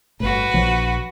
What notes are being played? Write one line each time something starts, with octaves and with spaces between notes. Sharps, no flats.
G1 A2 F#4 B4
A#1 F3 F#3